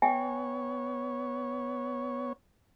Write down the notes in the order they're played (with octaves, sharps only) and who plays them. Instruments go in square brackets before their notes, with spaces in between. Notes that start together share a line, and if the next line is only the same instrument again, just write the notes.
[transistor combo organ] B3 C#5 [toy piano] E5 G5 G#5